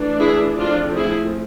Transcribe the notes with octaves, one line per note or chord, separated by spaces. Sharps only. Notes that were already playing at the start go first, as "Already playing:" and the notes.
Already playing: E3 A3 D4
E4 G#4
F3 A3 C4 D4 F4
E4 G#4